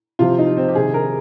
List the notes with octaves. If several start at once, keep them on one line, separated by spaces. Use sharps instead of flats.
C3 F3 F4
D#4
C4
G4
C3 D#3 G#4
A#4